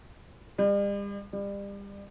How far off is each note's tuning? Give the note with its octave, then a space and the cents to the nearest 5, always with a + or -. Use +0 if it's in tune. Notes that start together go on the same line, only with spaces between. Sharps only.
G3 +40
G3 +30